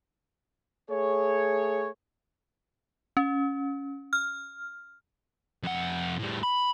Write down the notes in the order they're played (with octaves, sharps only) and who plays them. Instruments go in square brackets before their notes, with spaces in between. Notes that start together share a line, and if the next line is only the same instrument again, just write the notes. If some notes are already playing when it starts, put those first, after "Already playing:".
[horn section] A3 G#4 C#5
[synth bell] C#4
F6
[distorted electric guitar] F2 F#5
A2 G3
B5